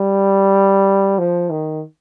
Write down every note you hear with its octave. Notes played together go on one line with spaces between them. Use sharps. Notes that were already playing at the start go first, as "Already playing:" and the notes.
Already playing: G3
F3
D#3